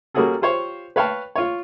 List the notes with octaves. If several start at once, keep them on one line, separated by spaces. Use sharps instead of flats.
G3 A#3 C#4 F#4 G#4 A4
F4 G4 C5 C#5 F5
B4 C#5 F5 G5 A5
F4 C#5